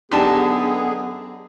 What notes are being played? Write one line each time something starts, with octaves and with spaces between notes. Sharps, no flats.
F#2 D3 B3 D4 D#4 G4 G#4 A5